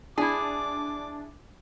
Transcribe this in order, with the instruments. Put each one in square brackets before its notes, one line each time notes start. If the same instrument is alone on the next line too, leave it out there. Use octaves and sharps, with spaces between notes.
[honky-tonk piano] D4 [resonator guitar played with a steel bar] E4 G#4 [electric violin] D6